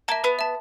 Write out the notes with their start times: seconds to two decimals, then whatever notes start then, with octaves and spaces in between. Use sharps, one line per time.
0.08 A#3 E5 A5
0.24 B3 B4
0.39 E5 A5